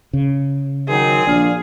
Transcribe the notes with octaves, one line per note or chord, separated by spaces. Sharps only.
C#3
D#3 F#3 C4 G#4
A#1 D5 F5